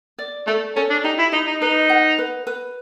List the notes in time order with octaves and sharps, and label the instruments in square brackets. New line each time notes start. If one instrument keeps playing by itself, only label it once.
[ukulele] D5
[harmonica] A3 [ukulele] A4
[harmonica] C#4 [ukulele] A4
[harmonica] D4
[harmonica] D#4 [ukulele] G4
[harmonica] E4
[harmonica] D#4 [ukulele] D#5
[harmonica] D#4
[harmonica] D#4 [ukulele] B4
[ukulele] F#5
B4
B4